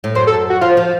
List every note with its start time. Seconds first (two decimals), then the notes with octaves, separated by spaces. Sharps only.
0.04 A2
0.15 F#2 C5
0.27 A4
0.50 F#4
0.61 F3 F4
0.77 F3